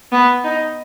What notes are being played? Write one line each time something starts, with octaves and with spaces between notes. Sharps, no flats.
B3
D#4